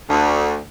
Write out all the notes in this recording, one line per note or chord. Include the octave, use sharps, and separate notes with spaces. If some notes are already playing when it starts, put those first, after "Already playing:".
D2